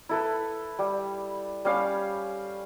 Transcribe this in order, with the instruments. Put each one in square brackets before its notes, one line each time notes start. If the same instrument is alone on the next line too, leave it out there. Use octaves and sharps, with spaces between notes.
[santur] E4 A4 B4
G3
G3 C#4 F5